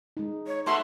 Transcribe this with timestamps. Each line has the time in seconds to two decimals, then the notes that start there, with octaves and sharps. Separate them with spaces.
0.17 G#3 D#4
0.47 C#5
0.66 A3 B3 F#4 E5 C6